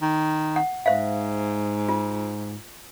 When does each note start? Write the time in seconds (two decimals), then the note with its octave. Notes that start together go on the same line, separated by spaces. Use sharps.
0.02 D#3
0.56 F#5
0.86 G#2 C5 E5 F5
1.89 F4